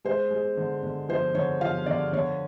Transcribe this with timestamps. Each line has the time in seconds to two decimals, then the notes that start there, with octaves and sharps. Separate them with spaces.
0.05 G#3 C5
0.31 G#3
0.57 D3
0.83 D3
1.09 F3 C5
1.34 D3 C#5
1.61 F3 F5
1.86 D3 D5
2.13 D3 C#5